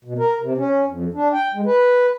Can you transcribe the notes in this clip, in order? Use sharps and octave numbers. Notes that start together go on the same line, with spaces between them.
B2
A#4
C3
C#4
F2
D4
G5
G#3
B4